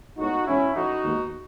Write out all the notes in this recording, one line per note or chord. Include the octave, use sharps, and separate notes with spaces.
A2 G#3 B3 D#4 F#4
E2 B2 G#3 C#4 E4
A2 E3 A3 D#4 F#4
D#2 D#3 G#3 B3